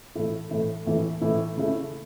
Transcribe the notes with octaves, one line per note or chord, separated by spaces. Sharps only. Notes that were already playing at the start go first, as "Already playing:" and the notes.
A2 E3 A3 E4
A2 E3 A3 E4
A2 E3 A3 E4
A2 E3 A3 E4
C#3 A3 E4